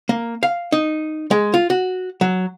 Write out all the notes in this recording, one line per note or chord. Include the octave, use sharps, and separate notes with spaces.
A#3
F5
D#4
G#3
F4
F#4
F#3